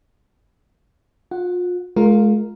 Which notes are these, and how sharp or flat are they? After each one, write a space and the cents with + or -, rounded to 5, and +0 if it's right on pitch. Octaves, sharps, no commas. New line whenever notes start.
F4 +35 F#5 +0
G#3 +40 F4 +5 A#4 +0